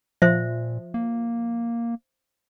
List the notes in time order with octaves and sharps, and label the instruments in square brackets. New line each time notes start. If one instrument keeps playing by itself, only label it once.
[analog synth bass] A#2 [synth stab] F3 [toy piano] C5 E5
[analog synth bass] A#3